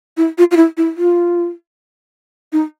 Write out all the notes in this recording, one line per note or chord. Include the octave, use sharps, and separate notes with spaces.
E4
F4
F4
E4
E4
F4
D#4